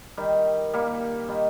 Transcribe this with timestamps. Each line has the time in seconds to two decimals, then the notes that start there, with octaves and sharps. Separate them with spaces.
0.18 D#3 G3
0.74 G3 A#3
1.29 D#3 G3